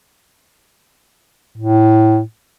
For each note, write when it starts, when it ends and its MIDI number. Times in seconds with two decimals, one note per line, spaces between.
1.58 2.20 45